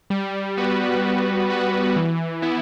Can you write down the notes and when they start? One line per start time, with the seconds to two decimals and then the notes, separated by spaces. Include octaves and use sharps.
0.10 G3
0.57 B3 F#4 B4
1.03 G3
1.49 B3 F#4 B4
1.96 E3
2.42 B3 E4